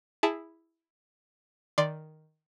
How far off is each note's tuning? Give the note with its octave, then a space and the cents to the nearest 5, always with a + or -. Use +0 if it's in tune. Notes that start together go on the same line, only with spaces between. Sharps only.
E4 +0 G#4 -15 A5 +0
D#3 +0 D5 +0 C6 +0